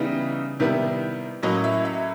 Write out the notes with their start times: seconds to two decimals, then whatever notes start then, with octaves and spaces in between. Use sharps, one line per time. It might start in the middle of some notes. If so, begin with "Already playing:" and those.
Already playing: C#3 E3 G3 B3 D#4 E5
0.60 C3 D#3 G3 B3 E4
1.43 A2 F#3 A#3 C#4 D#5
1.64 E5
1.85 E5